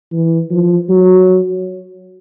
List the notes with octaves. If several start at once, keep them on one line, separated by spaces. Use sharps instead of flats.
E3
F3
F#3